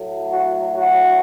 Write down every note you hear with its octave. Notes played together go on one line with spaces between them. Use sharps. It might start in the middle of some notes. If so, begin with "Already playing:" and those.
Already playing: A2 F#3 A3
F#4
F#4